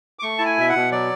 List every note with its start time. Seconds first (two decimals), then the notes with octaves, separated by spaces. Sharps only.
0.19 D6
0.22 A3 C#6
0.38 E4 A5
0.45 G#5
0.58 B2 E5
0.69 F#5
0.75 B2
0.91 F#3 D5